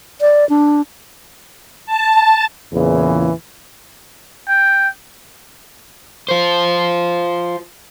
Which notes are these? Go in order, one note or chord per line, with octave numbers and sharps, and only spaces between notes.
D5
D4
A5
E2 A#2 C#3 E3
G5
F4 C5